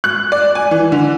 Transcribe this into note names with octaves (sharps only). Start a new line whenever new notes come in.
F#6
D5
G#5
E3
D3